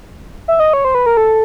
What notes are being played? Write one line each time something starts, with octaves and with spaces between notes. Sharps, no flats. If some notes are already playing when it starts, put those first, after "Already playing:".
E5
D#5
C#5
C5
B4
A#4
A4